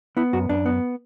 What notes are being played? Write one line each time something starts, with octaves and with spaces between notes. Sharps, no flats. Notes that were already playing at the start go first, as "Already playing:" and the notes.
B3 E4
F#2 F#4
F#2 D4
B3